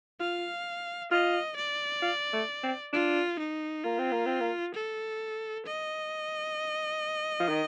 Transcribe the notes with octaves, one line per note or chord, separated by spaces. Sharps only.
F4 F5
F4 D#5
D5
F4
A3
C4
D4 F4
D#4
A#3 F4
C4
A#3
C4
A#3
A4
D#5
F3
D#3